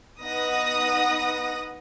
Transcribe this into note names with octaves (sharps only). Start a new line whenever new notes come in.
B3 D#4 F#5 D#6 A#6